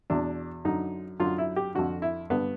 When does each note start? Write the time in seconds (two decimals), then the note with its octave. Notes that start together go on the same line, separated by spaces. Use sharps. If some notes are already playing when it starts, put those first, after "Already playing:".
0.10 E2 B2 D4
0.65 F#2 D3 D#4
1.20 F#2 D3 F4
1.38 E4
1.56 G4
1.75 F2 D3 F#4
2.02 E4
2.30 G2 D3 B3